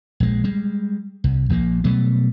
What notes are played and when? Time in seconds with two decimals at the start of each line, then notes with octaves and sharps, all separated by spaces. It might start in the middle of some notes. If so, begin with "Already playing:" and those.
0.20 A#1 G#3
0.44 G3 G#3
1.24 C2
1.50 A#1 F3 A#3
1.84 B2 F#3 G3 A3